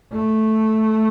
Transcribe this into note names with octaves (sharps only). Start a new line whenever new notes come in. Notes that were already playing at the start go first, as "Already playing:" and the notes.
A3